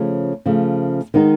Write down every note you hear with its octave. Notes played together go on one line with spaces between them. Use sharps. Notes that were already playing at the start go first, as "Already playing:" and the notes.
Already playing: C#3 F3 A3
C#3 F3 A3
D#3 G#3 B3 D#4